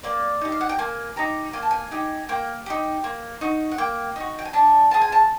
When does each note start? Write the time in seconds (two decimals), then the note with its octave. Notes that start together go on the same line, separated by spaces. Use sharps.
0.03 A#3 D5
0.41 D#4 G4
0.52 F5
0.61 F#5
0.69 G5
0.79 A#3 G#5
1.16 D#4 G4 A#5
1.53 A#3 G#5
1.63 A5
1.71 G#5
1.91 D#4 G4
2.29 A#3 G5
2.66 D#4 G4
3.04 A#3
3.41 D#4 F#4
3.71 F#5
3.78 A#3 G5
4.16 D#4 F#4
4.39 G5
4.46 G#5
4.53 D4 A5
4.91 F4 G#4 A5
5.02 G#5
5.12 A5